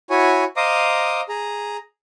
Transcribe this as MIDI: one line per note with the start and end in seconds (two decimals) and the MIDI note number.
0.10 0.44 64
0.10 0.44 66
0.10 0.44 73
0.10 0.44 80
0.57 1.21 72
0.57 1.21 75
0.57 1.21 77
0.57 1.21 82
0.57 1.21 86
0.57 1.21 87
1.29 1.77 68
1.29 1.77 82